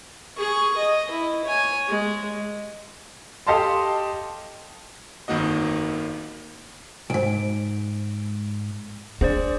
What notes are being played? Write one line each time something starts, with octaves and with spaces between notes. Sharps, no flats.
G#4 C#6
D#5
E4
C#5 G#5
G#3
G4 A4 D#5 F5 A5 C6
G1 F2 D#3 A#3 F#4 D#5
B1 G#2 D7
D4 G#4 C5 D5